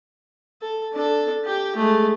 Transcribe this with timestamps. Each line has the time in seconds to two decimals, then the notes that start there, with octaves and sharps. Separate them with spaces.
0.62 A4
0.93 D4 A4
1.44 G4 G5
1.76 G#3 A3